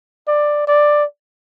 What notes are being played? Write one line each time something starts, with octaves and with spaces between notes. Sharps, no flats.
D5
D5